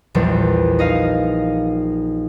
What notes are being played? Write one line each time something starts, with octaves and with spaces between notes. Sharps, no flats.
A#1 E2 G3
D#4 D#5 F5